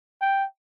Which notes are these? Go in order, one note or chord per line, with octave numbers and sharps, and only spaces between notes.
G5